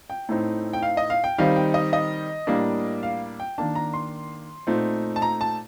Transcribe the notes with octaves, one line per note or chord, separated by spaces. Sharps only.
G5
A2 A3 C4 D#4
G5
F5
D#5
F5
G5
D#3 G3 C4 D#4 F5
G5
D#5
D#5
A2 G3 A#3 D4
F5
G5
D#3 A#3 D4 A5
A#5
C6
A#2 A3 C4 D#4
A5
A#5
A5